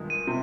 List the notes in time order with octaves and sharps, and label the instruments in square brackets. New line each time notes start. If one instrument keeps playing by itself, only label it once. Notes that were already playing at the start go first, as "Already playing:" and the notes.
Already playing: [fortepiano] G2 D#3 G#3
[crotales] D#7
[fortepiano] C3